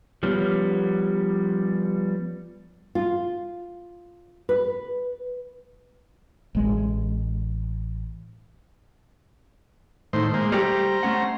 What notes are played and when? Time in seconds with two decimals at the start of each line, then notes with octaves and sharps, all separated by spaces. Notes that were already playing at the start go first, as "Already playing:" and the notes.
0.23 F3 G3 B3 C#4
2.95 F4
4.49 B4
6.55 A1 G#3
10.13 A2 D#3 C5
10.34 G#3 A#3 C5
10.52 G3 A3 G4 C5 A#5
11.03 A3 C#4 F#5